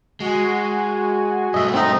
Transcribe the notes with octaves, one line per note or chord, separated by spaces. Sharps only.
G#3 F#4 G#5
G2 A3 D#5 E5
C4 D#4 E5